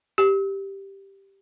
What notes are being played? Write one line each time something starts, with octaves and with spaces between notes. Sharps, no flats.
G4